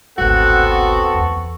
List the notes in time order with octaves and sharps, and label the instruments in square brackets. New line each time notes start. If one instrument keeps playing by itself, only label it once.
[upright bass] D1 G#1 [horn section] B3 C4 A4 [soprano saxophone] F#4 [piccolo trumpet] F#5
[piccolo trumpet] C#6
[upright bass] E2